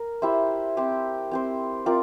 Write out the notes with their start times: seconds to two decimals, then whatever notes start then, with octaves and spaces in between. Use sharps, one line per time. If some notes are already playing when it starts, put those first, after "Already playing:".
Already playing: A#4
0.22 E4 G4 C5 E5
0.77 C4 G4 C5
1.31 C4 G4 C5
1.86 C4 F4 A#4 D5